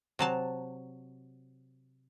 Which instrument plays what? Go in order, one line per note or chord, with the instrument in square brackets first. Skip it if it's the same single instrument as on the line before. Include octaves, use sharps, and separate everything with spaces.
[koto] C3 F#3 A5